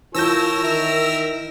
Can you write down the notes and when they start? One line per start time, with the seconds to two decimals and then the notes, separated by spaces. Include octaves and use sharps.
0.15 E3 F4 A#4 C#5 A5 E6 G6 A#6
0.63 D#3 A#4 E5